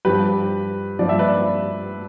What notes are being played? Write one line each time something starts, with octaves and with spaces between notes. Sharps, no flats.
G2 F3 G4 B4
G2 F3 D5
E5
B4 D5